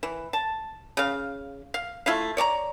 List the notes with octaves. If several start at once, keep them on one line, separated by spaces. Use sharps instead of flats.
E3
A5
C#3 F5
F5
A3 E4 F4 F5
C#5 D5 A5 A#5